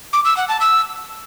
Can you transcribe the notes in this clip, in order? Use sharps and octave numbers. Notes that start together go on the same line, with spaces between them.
D6
E6
F#5
A5
E6